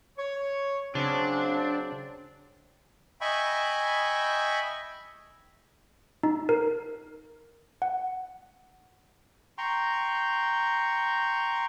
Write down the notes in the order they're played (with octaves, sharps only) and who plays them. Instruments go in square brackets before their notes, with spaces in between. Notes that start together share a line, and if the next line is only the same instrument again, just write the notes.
[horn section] C#5
[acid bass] C#3 [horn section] F#3 C4 [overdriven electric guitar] D4
[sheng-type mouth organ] D#5 E5 G5 G#5 B5 C#6
[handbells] D#4
A#4
F#5
[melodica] G5 A#5 C6 C#6